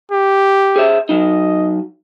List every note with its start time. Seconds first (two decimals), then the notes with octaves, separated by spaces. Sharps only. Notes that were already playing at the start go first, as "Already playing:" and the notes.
0.12 G4
0.76 G#4 C5 E5
1.09 F#3 D#4 D#5